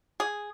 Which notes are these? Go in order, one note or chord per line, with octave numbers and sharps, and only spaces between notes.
G#4